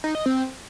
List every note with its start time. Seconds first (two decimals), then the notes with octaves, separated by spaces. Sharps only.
0.04 D#4
0.15 D#5
0.26 C4